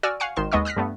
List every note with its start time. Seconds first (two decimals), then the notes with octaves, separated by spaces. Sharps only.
0.03 F#4 D5 G#5 E6 F6
0.20 F5 F#5 G#5 C#6 C7 C#7
0.36 G#1 D#3 C6 E7
0.52 D#2 G#3 B3 D#5 C#6 E6
0.65 D#6 F6 F#6 A#6 B6
0.76 G2 A3 B3